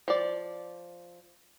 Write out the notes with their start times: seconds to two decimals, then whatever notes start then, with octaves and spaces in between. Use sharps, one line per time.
0.08 F3 D5